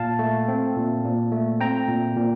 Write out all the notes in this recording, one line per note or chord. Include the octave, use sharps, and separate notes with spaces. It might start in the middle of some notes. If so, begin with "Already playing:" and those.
Already playing: A#2 F5 A5
A3
C4
A#2
A#2
A3
C4 G5 A#5
A#2
A#2